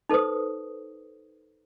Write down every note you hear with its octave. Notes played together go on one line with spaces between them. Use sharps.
D#4 A4 B4 C5 D#6